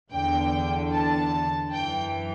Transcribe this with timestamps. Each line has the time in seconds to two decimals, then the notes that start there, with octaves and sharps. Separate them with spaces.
0.12 E2 D3 G5
0.92 A5
1.72 F#2 E3 G5